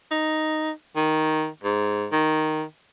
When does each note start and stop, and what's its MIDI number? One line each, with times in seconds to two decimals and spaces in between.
0.11 0.71 63
0.96 1.47 51
1.64 2.06 44
2.12 2.63 51